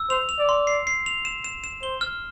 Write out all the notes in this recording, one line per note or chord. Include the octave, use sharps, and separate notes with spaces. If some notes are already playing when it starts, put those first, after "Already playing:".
Already playing: E6
C5 F7
F7
D5
C6
C7
C7
F7
E7
E7
E7
C5 G7
F6